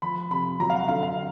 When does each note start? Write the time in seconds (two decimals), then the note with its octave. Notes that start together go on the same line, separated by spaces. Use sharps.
0.02 F3 B5
0.31 C3 B5
0.60 F#3 A#5
0.70 F5
0.74 F#5
0.88 D3 F5
1.03 F5